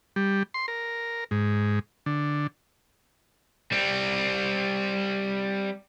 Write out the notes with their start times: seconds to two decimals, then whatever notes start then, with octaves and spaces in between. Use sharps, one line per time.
0.16 G3
0.54 C6
0.68 A#4
1.31 G#2
2.06 D3
3.72 G3 C4